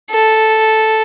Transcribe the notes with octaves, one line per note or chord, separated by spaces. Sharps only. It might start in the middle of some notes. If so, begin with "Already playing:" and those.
A4